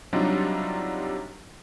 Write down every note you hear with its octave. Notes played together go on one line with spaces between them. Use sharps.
C3 F#3 G3 D4 D#4 F4